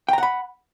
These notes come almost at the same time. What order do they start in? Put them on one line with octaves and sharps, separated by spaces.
G5 A#5 F#5 B5